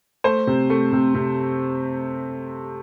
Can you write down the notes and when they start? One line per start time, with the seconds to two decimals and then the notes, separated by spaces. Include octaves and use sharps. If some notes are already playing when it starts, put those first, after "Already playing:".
0.24 A3 C5
0.47 C3
0.70 A3
0.93 C3
1.14 C3